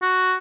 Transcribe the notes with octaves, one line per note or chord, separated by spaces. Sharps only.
F#4